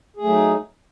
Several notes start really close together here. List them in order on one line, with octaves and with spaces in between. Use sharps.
G#4 A3 F#3 D#4